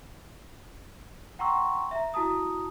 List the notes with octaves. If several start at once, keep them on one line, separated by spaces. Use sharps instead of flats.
F#5 G5 A#5 C6 C#6 E6
E5 A#5
E4 F#4 A5 A#5 D#6